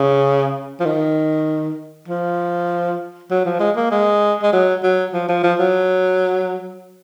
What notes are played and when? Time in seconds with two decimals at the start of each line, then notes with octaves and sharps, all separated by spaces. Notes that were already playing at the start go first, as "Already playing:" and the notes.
Already playing: C#3
0.80 F3
0.85 D#3
2.08 F3
3.31 F#3
3.46 F3
3.60 G#3
3.76 A#3
3.91 G#3
4.43 G#3
4.53 F#3
4.83 F#3
5.13 F3
5.29 F3
5.43 F3
5.59 F#3